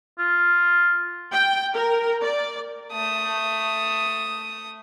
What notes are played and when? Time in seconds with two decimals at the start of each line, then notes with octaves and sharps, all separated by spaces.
0.19 F4
1.33 G5
1.74 A#4
2.22 D5
2.93 A3 D#6